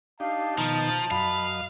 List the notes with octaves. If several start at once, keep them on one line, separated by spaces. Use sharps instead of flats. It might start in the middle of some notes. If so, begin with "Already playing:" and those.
D4 D#4 G4 F5 A5
B2 D#3 F3 D#4 A#5
F#2 D#5 F5 B5